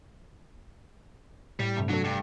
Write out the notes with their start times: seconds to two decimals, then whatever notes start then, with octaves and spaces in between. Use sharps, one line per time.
1.60 A2 G3
1.76 G2 C3 A3
1.89 F#3 D4 A4
2.04 G2